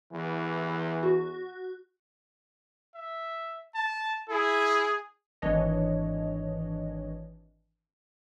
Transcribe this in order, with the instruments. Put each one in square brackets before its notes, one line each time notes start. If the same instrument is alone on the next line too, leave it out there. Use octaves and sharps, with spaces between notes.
[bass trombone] E2 [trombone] E3
[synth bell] F#4
[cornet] E5
A5
[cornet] E4 [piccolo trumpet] G#4
[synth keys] G#1 E3 D4 C#5 D#5